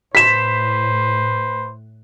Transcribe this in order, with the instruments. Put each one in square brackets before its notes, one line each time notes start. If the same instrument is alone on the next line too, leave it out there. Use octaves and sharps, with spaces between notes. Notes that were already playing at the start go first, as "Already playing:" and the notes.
[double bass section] A2 [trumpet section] B4 C5 [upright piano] B6 E7